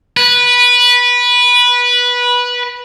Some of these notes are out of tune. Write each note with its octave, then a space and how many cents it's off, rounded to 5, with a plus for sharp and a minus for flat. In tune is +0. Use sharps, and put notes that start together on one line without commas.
B4 -15